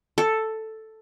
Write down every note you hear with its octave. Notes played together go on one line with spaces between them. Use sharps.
A4